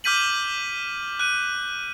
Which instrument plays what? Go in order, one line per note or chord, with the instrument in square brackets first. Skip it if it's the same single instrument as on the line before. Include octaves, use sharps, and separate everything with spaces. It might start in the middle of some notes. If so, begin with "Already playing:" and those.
[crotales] D6 F6 G6 B6 D#7 F#7
F#6 D#7